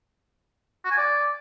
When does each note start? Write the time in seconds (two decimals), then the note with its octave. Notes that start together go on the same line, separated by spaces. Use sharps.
0.85 F#4
0.91 G#5
0.97 D5